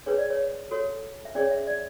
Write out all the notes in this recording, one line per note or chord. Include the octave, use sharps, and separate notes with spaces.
D4 G#4 B4 C#5
D5
C#5
F#4 A4 C#5
E5
C#4 G#4 C#5 D5
E5
D5